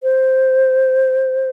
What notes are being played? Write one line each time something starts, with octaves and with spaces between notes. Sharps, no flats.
C5